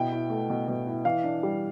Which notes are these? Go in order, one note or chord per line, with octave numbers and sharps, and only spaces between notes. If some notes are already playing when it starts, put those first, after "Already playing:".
Already playing: B2 E4 G5
E4
A3
B2
B2
E4
E3 F5
D4
G3